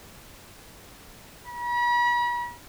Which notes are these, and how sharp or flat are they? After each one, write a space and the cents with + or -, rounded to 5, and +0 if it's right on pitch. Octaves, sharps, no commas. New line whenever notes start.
B5 -45